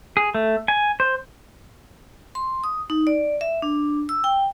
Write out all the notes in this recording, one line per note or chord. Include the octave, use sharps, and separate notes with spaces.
G#4
A3
G#5
C5
C6
D#6
D#4
D5
E5
D4
E6
G5